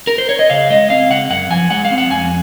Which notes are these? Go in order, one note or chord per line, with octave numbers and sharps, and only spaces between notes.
A#4
C5
C#5
D#5
C#3 F5
G#3 D#5
C4 F5
C#3 F#5
F#2 F#5
F3 G#5
G#3 F#5
F5
C4
F#5
F2 G#5